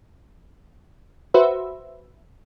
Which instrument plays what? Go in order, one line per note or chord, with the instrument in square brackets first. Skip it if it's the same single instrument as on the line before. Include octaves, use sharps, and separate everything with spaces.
[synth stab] F#4 B4 C5 E5